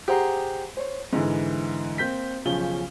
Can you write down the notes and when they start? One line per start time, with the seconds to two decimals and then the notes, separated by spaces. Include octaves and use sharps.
0.08 G4 G#4 C5 F#5 A#5
0.77 C5 C#5
1.13 G#2 D3 E3
1.98 A#3 C4 G6 B6
2.45 B1 C#3 F3 C#4 F4 G7